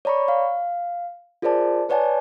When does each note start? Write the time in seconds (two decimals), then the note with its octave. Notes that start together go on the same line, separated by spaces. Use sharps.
0.05 C#5 D5 A#5 B5 C#6
0.28 F5
1.42 F4 G#4 A#4 C5 D5 A5
1.89 B4 C#5 D5 F#5 G#5 A5